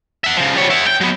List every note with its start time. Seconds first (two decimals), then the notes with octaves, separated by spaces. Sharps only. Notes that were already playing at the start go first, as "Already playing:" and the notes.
0.24 E5 F#5
0.37 C#3 F3
0.55 G3 C#5
0.70 B3 E4
0.87 G5
1.01 F#3 B3